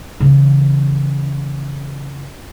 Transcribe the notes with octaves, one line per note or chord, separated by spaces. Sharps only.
C#3 E3